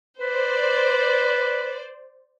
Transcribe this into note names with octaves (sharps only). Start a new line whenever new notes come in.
B4 C5 D5